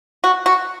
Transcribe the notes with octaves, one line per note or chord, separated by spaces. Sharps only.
F#4
F#4